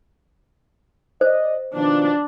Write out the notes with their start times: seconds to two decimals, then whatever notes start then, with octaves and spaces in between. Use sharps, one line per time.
1.21 C5 D5 D#5
1.74 B2 D#3 F3 D4